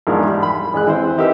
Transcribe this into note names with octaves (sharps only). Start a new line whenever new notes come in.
E2 G#2 F3 D4 A#4
G3
B5 C6
A1 G#3 G#4 F#6
E3 C4 C5
D#4 G4 A#4 B4 E5